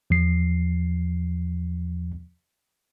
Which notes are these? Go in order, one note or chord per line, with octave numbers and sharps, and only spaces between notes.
E2 F3 C7